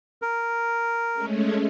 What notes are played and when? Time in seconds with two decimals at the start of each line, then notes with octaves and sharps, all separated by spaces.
0.22 A#4
1.14 G#3 A3 C#4